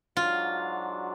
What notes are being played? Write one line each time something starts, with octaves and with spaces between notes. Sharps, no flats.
G#2 F#3 D4 F4 F#4